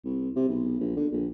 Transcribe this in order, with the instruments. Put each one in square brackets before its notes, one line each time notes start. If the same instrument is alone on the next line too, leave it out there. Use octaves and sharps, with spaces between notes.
[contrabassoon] C2
C3
B1
A#1
D3
A#1